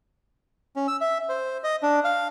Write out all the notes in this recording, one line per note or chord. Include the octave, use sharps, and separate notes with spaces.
C#4
E6
E5
C5
D#5
D4
F5